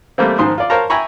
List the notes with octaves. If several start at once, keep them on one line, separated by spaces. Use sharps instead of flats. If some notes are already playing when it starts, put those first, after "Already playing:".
G3 A3 A#3 C4
G#2 D#3 F3 C6 D#6
F4 D5
A#4 C5 C#5 F5 A5 A#5
E5 G5 G#5 A#5 B5 C#6